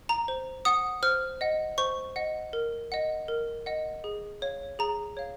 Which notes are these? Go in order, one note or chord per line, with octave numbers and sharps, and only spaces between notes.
A#5
C5
F#5 D#6
C5 F6
D#5 F#5
C5 C#6
D#5 F#5
A#4
D#5 F#5
A#4
D#5 F#5
G#4
C#5 F5
G#4 A#5
C#5 F5